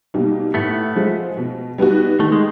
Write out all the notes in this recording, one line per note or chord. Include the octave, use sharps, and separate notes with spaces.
B2 G3 A#3 D#4
A2 A3 B3
F3 G#3
B2
G3 B3 D#4 F#4
D#3 A3
G#3